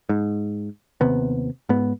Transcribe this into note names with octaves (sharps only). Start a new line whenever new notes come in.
G#2
D#2 C3 B3
G#2 B3